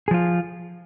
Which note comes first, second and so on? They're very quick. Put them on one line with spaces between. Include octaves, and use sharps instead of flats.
G#4 F3 F4